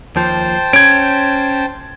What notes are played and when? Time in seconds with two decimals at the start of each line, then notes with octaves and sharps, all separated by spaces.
0.16 D#2 F3 C5 G5 A5
0.73 C#4 G#6 D7